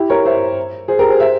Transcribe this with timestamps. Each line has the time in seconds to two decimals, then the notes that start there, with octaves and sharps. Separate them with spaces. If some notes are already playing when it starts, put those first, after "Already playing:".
Already playing: E4 G4
0.10 A#4 C#5
0.26 C5 E5
0.88 G#4 C5
0.99 G4 A#4
1.09 G#4 C5
1.20 C5 E5